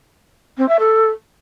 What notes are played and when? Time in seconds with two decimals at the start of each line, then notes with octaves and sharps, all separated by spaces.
0.58 C4
0.68 E5
0.79 A4